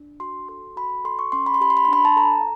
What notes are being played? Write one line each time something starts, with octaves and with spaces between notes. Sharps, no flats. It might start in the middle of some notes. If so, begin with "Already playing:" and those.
Already playing: D4
F#4 C6
A4 C6
F#4 B5
A4 C6
C#6
C#4 C6
B5
C6
G4 B5
C6
B5
C6
D4 B5
A5
A4 A#5